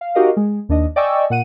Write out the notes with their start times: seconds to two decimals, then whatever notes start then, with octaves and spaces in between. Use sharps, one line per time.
0.01 F5
0.15 D#4 F#4 G4 A#4 D#5 F5
0.37 G#3
0.69 D#2 D4 D#5
0.96 D5 D#5 G5 G#5 C#6 E6
1.30 A#2 F#5 D#7